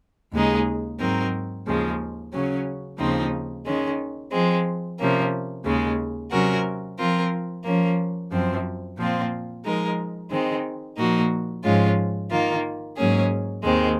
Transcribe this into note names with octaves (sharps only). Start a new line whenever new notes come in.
D#2 C#3 G#3 D#4 G#4
G#2 F#3 C4 D#4 A#4
D#2 C#3 F3 G#3
C#3 F#3 C#4
D#2 C#3 F3 C4 D#4
D#3 G#3 C#4
F3 G#3 C4
C3 F3 A#3 C#4
D#2 C#3 G#3
C3 F#3 C#4 F#4 A#4
F3 C4 F4 A#4
F3 A#3 C#4
F#2 F3 C4
A#2 F3 C4 F4
F3 G#3 D#4 A#4
D#3 G#3 C4
A#2 F3 A#3 D#4 F#4
G#2 F3 G#3 C#4 F4
D#3 A#3 F4
G#2 F#3 A#3 C#4 G#4
D#2 D#3 G#3 C4